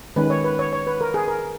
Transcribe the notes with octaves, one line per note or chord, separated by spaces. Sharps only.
D#3 G#3 C#4 B4
C#5
B4
C#5
C#5
B4
A#4
G#4
A#4